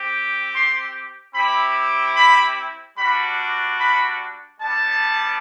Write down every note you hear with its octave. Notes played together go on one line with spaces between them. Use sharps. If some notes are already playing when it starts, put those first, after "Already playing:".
Already playing: C4 G4
C6
C4 E4 G4 B5
B5
G3 D4 F#4 B5
B5
G3 B3 D4 A5